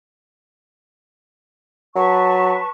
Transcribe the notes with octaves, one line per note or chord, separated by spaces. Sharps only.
F#3 B4 A5 C#6